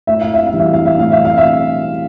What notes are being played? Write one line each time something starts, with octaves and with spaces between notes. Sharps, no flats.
A2 E5
F5
E5
F5
E3 G3
E5
F5
E5
A2 F5
E5
F5
E5